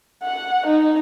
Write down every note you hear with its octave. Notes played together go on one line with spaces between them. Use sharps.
F#5
D#4